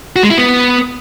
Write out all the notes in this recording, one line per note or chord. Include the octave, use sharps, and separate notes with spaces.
F#4
G#3
E4
B3